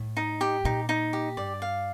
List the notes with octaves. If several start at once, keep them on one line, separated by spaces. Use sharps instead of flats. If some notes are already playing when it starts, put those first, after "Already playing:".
Already playing: A2
D#4
G4
A#2 D#4
D#4
G4
G2 D5
F5